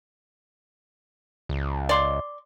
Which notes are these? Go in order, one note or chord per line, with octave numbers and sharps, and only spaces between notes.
C#2
D5 C6